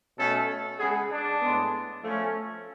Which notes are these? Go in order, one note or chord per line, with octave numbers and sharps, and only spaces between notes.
B2 A3 C#4 A4
C#3 G#3 B3 G#4
D4
A2 G#3 B3
F3 A3 C#4